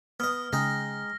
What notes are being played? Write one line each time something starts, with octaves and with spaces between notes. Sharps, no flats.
B3 D#5 F6
C#3 G#3 D#4 G5 A#6